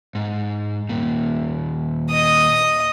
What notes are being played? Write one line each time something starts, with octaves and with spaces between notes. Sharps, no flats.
G#2
D#2 A#2
D#5 D#6